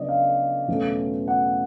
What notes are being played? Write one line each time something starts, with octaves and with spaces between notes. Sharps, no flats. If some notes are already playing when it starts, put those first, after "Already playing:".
Already playing: C#3 F#3 B3 D4 D5 D#5
F5
E2 B2 F#3 A3 C#4
F#5